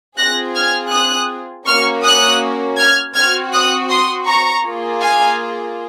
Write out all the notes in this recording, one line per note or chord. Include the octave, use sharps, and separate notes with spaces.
C4 F4 G#4 F#6 A#6
F6 G#6
D#6 F#6
A#3 C#4 F#4 C#6 F6
D#6 F#6
F6 G#6
C4 F#4 F6 G#6
D#6 F#6
C6 D#6
A#5 C#6
A#3 F4 G#4
F5 G#5